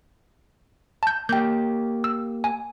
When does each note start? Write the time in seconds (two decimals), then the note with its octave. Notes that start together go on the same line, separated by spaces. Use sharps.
1.03 A5 G6
1.29 A#3 G4 G5 G6
2.04 E6
2.44 G#5